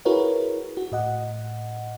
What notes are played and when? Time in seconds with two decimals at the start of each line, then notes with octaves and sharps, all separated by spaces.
0.05 E4 F#4 G#4 A#4 B4 C#5
0.77 F#4
0.92 A2 D#5 F#5